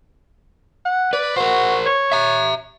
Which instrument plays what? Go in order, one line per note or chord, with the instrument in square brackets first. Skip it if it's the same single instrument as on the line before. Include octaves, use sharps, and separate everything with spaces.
[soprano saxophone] F#5
[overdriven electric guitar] B4 [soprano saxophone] D5
[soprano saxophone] F#4 [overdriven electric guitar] A#4 C5
[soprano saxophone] C#5
[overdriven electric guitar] E5 A#5